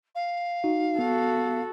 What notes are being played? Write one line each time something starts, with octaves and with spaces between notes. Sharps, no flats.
F5
D#4 F#4
B3 F#4 A4